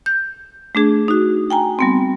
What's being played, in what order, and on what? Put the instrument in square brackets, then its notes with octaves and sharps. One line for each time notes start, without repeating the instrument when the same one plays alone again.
[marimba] G6
A3 D4 G#4
D#4 F#4
G5 G#5 A#5
G3 B3 C4